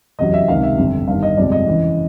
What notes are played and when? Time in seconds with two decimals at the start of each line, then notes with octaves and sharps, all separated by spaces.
0.19 F1 E2 C#3 F#3 D#5
0.34 E5
0.48 C#2 C3 D#3 F5
0.63 E5
0.77 G1 F2 D3
1.08 G1 G2 D#3 F5
1.23 D#5
1.37 G1 F2 C3 F3 G#3 D5
1.52 D#5
1.67 E2 C#3 E3